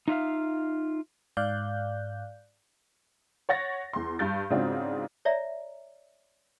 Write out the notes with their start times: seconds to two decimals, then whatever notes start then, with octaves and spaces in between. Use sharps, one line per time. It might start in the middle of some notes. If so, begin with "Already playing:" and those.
0.08 D#4 F4 E5 F5
1.37 G#2 D5 F5 F#6 G6
3.49 C#5 F#5 A6 A#6
3.93 E2 C6
4.19 G2 G6 A6
4.50 G#2 C#3 C4 D4 F4 F#4
5.25 C#5 D5 E5 A#5